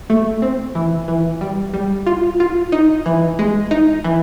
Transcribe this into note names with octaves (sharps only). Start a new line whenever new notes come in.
A3
C4
E3
E3
G3
G3
F4
F4
D#4
E3
G#3
D#4
E3